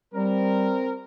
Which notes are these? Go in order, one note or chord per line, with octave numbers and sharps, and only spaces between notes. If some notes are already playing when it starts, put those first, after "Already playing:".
G3 C4 A#4